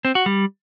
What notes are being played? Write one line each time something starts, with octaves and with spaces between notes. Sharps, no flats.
C4
F#4
G3